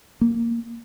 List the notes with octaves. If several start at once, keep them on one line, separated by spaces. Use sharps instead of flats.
A#3